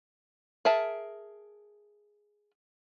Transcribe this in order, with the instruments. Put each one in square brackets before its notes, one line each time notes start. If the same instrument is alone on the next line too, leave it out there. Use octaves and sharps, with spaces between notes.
[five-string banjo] G#4 A#4 E5 A5